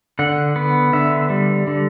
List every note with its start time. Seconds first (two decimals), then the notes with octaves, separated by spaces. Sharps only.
0.19 D3 F#5
0.56 B3
0.93 D3 E5
1.30 G3
1.67 D3